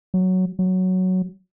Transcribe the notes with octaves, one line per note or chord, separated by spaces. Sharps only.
F#3
F#3